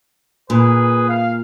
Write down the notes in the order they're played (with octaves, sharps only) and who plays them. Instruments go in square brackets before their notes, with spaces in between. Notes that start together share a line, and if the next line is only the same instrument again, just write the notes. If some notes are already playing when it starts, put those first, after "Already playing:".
[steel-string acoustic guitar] A#2 [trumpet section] G#4 B4
[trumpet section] F5